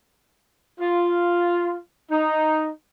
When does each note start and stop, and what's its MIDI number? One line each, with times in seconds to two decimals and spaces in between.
0.79 1.76 65
2.11 2.67 63